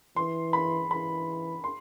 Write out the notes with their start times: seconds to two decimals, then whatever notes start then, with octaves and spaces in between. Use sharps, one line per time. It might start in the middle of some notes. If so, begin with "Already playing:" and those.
0.16 E3 C6
0.53 B5
0.90 E3 B5
1.64 C6